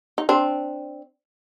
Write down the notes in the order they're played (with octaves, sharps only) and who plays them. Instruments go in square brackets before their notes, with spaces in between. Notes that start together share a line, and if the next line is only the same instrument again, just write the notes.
[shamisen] D#4
C4 D4